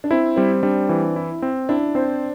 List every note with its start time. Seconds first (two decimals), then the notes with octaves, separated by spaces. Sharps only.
0.04 D4
0.11 C4 E4
0.36 G3 C4
0.63 G3 D4
0.89 E3
1.16 E4
1.42 C4
1.69 D4 E4
1.95 C4 C5